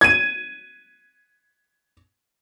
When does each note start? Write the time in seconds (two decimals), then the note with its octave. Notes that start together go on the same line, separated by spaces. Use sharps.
0.01 G#6 D#7